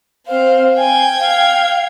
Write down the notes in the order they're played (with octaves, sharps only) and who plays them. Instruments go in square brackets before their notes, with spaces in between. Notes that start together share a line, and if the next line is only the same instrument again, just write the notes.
[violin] C4 C5 [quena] F5
[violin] G5 G#6 [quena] G#5
[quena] F5